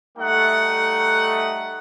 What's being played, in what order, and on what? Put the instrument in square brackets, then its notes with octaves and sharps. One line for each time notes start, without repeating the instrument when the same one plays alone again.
[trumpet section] G3 A3 D#4 F#5